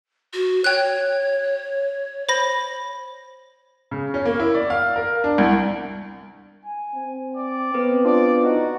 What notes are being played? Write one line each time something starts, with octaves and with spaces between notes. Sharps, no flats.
F#4
C#5 G5 F#6
C5 B5 A#6
C#3
C#4
A#3
E4
D5
F5
A#4
D4
C2
G#5
C4
D5
B3 C4 A4 B4
D4 F4 C5 D5
D#4 F#4